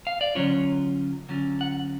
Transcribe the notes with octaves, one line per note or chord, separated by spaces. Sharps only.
F5
D5
D3 F#3 C#4 F4 C#5
D3 F#3 C#4 F4
F#5